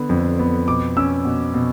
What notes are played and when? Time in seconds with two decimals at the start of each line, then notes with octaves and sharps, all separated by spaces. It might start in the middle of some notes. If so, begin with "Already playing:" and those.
Already playing: D3 B3
0.09 F2
0.39 B3
0.68 B2 D6
0.97 C#4 E6
1.25 B2
1.54 B2